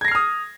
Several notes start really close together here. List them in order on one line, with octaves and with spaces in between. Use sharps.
G#6 A#6 C7 F6 D#6